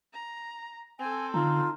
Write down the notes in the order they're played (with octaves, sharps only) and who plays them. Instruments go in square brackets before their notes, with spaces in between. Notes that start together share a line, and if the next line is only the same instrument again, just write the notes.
[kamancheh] A#5
[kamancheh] C4 A4 [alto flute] G#5
[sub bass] D3 [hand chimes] D#4 A#5 [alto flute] F4